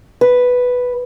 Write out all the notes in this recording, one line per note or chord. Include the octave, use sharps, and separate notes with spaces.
B4